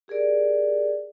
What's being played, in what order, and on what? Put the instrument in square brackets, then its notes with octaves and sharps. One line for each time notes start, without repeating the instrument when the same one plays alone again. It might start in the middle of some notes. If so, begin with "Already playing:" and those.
[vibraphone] G4 G#4 A#4 D5